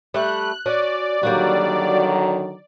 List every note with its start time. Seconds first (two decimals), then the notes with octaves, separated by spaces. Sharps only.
0.14 G3 A3 F#6
0.66 C#4 F#4 D5
1.23 D3 D#3 F#3 G3 A#3 F#4